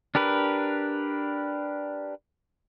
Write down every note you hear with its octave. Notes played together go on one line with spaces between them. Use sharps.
D4 G4 A#4 B4